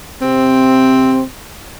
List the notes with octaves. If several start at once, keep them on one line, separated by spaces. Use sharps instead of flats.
C3 C4